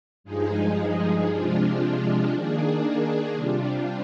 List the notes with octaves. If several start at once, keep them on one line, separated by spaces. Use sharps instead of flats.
G2 F3 G#3 D#4 G#4
C3 F3 G#3 D4 F4
D#3 A#3 D4 G#4
C3 G3 D4 F4